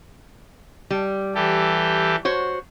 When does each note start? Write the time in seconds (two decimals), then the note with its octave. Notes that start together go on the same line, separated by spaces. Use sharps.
0.90 G3
1.35 E3 G4 A4
2.25 F#4 C5 C#5